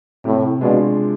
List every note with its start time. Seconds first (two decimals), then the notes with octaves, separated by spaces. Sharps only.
0.25 A2 C3
0.61 B2 G#3 D4 F4